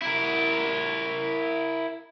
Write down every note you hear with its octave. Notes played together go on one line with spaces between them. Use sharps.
E4 A#4